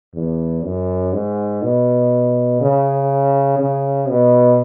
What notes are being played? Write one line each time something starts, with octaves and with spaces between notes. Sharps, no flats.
E2
F#2
G#2
B2
C#3
C#3
B2